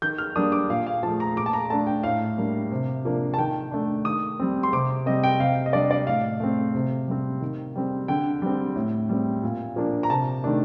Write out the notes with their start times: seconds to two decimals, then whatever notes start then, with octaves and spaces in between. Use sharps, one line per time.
0.02 D#3 G6
0.18 F6
0.36 G3 A#3 D4 D#6
0.52 D6
0.69 A#2 F5
0.87 F5
1.03 F3 A3 A5
1.20 A#5
1.36 A#2 D6
1.46 A5
1.53 A#5
1.70 A3 D4 A5
1.87 G5
2.03 A2 F5
2.37 G3 A#3 D4
2.72 C3
3.05 F3 A#3 D4
3.34 A5
3.38 D#3 G5
3.71 A3 D4
4.05 D#3 D#6
4.40 G3 C4
4.63 C6
4.73 C3 D6
5.06 G3 C4 D#5
5.24 G5
5.40 C3 F5
5.66 D#5
5.73 G3 D4 D5
5.91 D5
6.07 A2 F5
6.40 A3 C4
6.75 C3
7.08 G3 C4
7.41 D#3
7.75 G3 C4
8.08 D3 G5
8.42 G3 C4
8.76 A2
9.09 G3 C4
9.43 A#2
9.76 F3 A#3 D4
10.03 A#5
10.09 C3 A5
10.44 D#3 A3 D4